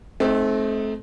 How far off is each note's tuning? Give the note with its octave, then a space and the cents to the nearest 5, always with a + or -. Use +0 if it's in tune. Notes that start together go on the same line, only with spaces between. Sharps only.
A3 -30 C4 +10 D#4 +0